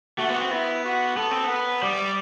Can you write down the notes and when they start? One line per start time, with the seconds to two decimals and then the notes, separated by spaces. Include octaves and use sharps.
0.18 A3 F#4
0.29 B3
0.40 C4
0.51 B3 E4
0.85 F#4
1.17 B3 A4
1.31 C4
1.44 B3
1.50 B4
1.82 G3 D5